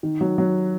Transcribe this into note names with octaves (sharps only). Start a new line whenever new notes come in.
D#3
F#3
F#3